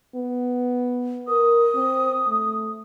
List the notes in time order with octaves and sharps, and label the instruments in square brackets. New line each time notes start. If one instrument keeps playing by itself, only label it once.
[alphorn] B3
[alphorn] A#4 [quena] D#6
[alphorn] C4
A3